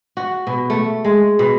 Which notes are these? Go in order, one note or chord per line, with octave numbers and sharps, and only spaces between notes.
F#4
B2
A3
G#3
B2